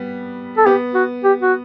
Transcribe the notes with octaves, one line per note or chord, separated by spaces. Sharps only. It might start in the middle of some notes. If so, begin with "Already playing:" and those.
Already playing: G3 B3
A4
B3 G4
F#4
G4
F#4